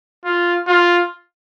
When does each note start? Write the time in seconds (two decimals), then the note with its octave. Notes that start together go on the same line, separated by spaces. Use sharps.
0.25 F4
0.68 F4